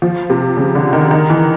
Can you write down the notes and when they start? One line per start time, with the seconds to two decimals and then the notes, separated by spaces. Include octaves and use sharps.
0.02 F3
0.30 C3
0.57 C#3
0.75 D3
0.93 D#3
1.11 D#3
1.30 E3